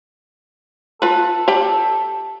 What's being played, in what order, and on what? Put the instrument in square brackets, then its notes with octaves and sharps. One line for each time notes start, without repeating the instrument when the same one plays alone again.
[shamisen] F4 B4 [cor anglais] A4
[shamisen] G4 D5 G5